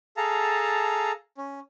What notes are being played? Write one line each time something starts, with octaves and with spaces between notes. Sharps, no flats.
G#4 A4 F5 A5 A#5
C#4